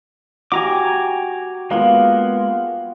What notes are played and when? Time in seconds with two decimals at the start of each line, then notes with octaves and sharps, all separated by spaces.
0.52 F#4 G4 G#5 A#5 D6
1.71 G#3 A#3 B3 F4 F5